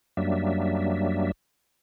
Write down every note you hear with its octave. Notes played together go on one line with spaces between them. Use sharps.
F#2 F#3 G3 A#3 D4 E5